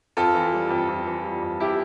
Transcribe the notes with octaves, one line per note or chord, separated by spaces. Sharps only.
F2 F4 A4
E3
G3
F2
F2
E3
G3
F2
E4 G4